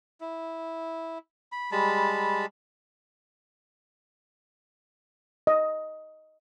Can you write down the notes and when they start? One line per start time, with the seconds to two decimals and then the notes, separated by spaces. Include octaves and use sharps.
0.21 E4
1.52 B5
1.72 G3 G#3 A5 B5
5.47 D#5